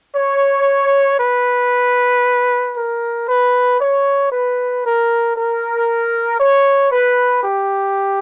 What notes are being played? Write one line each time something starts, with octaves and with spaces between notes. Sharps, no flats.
C#5
B4
A#4
B4
C#5
B4
A#4
A#4
C#5
B4
G4